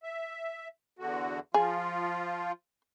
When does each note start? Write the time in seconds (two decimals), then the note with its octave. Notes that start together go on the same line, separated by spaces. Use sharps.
0.03 E5
0.99 E2 D3 F#4
1.54 F3 F4 G#4